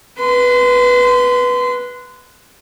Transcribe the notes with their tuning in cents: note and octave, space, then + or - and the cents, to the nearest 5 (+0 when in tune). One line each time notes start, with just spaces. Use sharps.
B4 -5 C6 -30